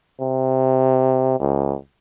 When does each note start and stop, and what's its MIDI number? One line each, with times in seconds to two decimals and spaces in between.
0.20 1.37 48
1.40 1.76 37